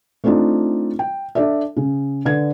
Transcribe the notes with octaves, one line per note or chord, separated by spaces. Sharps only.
A3 C4 D4 D#4 F4
G5
D4 A4 D5 E5
C#3
D3 B4 G#6